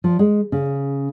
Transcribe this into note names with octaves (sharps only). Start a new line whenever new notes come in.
F3
G#3
C#3